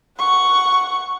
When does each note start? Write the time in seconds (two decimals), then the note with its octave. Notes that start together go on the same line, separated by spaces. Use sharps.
0.19 F#5 C#6